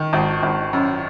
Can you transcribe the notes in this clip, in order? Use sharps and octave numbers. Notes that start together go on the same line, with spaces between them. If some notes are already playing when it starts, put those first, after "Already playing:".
Already playing: D#3
G#1
G#1
F#2